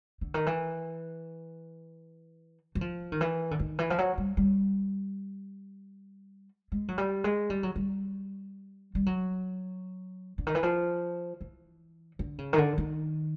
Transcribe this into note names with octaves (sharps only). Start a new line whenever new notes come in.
D3
D#3
E3
F#3
F3
D#3
E3
D3
D#3
E3
F3
F#3
G3
G3
G#3
F#3
G3
G#3
G3
F#3
G3
G3
F#3
D3
D#3
E3
F3
E3
D3
C#3
D#3
D3
D#3